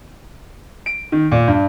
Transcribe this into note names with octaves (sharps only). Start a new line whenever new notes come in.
D7
D#3
A#2
G2